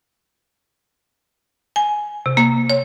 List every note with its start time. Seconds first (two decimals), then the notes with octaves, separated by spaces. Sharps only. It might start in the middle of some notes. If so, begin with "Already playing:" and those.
1.76 G#5
2.26 C3
2.37 A#3
2.70 C#5